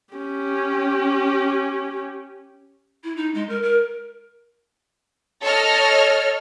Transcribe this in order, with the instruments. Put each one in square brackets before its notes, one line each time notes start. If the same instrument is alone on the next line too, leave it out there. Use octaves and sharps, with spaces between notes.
[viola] C#4 G4
[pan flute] E4
D#4
G#3
A#4
A#4
[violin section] A4 C#5 D#5 F6